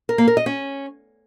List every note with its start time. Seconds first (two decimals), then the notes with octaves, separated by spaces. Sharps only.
0.09 A#4
0.18 A#3
0.28 A#4
0.37 D#5
0.46 C#4